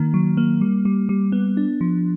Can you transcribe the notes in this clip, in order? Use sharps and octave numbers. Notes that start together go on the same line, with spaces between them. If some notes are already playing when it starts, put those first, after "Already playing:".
Already playing: D#3 A#3
F#3
A#3
G3
G3
G3
B3
D4
F3